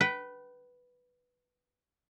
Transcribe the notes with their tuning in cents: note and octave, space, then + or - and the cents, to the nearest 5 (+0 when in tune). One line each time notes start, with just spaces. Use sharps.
B4 +0 G5 -40